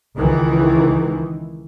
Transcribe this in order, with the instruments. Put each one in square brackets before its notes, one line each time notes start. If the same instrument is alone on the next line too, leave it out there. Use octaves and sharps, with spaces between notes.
[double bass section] C#2 D#3 E3